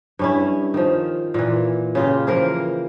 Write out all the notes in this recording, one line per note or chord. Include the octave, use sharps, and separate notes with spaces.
G2 C#4 E4
D#3 F3
A#2 E3
C#3 F4 G4
E3 F3 A#3 A#4